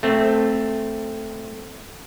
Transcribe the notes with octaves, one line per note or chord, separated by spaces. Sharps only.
A3 C4